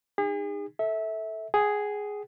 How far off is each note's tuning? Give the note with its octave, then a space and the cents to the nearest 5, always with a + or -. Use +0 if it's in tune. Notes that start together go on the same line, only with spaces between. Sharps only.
D#4 -25 G#4 -40
A4 +0 E5 -20
G#4 +0 G5 -45